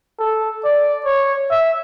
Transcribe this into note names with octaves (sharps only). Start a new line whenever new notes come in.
A4
D5
C#5
E5